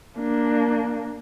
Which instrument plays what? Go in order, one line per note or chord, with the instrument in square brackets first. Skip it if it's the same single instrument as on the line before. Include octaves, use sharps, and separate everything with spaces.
[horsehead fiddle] A#3 D4